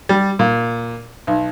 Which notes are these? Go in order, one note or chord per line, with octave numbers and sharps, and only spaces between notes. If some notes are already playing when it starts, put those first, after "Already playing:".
G3
A#2
B1